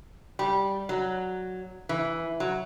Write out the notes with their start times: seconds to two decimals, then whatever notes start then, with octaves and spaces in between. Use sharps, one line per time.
0.39 G3
0.89 F#3
1.89 E3
2.40 F#3